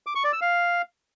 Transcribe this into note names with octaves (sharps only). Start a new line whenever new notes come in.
D6
C#6
D5
E6
F5